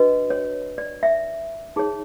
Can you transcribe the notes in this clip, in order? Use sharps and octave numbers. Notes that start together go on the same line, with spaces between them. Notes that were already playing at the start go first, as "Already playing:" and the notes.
Already playing: D4 F#4 B4 D#5
C#5
D5
E5
D#4 G#4 C#5